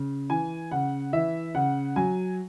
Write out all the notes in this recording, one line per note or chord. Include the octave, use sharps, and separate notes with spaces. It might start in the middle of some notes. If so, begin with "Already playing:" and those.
Already playing: C#3
E3 G#5
C#3 F#5
E3 E5
C#3 F#5
F#3 G#5